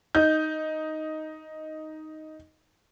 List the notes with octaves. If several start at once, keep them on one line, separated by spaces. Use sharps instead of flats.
D#4 G6